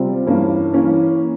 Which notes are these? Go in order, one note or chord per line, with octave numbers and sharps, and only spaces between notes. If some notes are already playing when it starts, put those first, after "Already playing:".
Already playing: C3 G3 C4 F4
G2 E3 A#3 C#4
E3 A#3 C#4